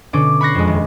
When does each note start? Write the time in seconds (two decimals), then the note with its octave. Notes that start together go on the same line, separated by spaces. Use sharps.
0.13 B2 D3 C#4 D6
0.41 B5 C#6 F#6 A#6 C7
0.55 F2 G#3
0.67 D#1